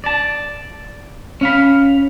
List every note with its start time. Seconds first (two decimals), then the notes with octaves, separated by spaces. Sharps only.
0.04 D5 A5
1.41 C#4 F5 B5